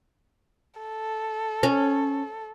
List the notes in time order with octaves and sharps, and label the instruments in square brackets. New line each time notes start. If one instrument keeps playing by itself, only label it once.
[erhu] A4
[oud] C#4